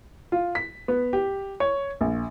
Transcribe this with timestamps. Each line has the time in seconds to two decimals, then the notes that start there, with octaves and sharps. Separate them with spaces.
0.32 F4
0.55 B6
0.88 B3
1.13 G4
1.60 C#5
2.01 A#1